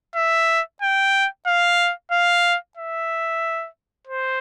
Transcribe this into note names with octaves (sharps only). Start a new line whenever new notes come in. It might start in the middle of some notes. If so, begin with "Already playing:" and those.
E5
G5
F5
F5
E5
C5